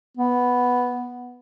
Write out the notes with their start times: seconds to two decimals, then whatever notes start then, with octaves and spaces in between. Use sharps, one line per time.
0.17 B3